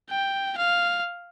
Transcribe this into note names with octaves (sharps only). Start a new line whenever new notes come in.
G5
F5